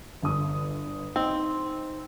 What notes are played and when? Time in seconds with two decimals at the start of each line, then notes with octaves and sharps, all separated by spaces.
0.22 G1 D#6
1.16 C4 D#4